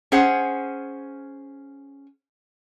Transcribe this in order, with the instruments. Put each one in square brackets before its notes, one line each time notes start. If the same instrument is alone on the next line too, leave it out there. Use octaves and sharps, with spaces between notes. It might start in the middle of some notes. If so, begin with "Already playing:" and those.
[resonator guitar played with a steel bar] C#4 G#4 C5 F#5